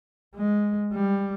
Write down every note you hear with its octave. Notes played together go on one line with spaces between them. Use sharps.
G#3
G3